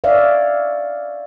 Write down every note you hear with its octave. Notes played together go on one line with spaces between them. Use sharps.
C#5 D5 E5 F5